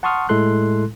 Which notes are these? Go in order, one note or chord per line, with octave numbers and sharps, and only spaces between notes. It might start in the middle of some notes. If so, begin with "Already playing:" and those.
F#5 A5 C6 C#6 D#6 F6
A2 G#3 E4 A4 C6 F#6